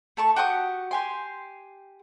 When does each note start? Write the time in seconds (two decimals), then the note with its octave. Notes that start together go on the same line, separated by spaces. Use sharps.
0.17 A3 A5 C#6
0.36 F#4 G4 C#6 D#6
0.91 G4 G#5 C6